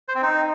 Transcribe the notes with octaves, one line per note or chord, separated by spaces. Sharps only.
C5
C4
D#4